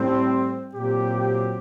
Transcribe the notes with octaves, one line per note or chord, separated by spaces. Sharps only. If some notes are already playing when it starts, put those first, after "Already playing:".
Already playing: A2 G3 C4
A#2 F#3 C4 G4